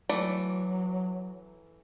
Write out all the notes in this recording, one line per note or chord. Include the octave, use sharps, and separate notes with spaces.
E3 F#3 A3 D5